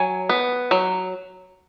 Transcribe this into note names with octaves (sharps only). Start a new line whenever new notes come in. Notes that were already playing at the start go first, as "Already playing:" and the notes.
Already playing: F#3 G#5
B3
F#3